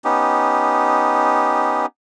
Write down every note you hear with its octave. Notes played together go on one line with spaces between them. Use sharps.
B3 C#4 D#4 G4